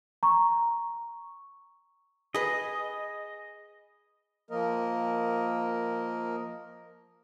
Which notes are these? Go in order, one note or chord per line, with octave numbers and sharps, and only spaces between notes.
A#5 C#6
G#4 B4 D#5
F3 A#3 A#4 D#5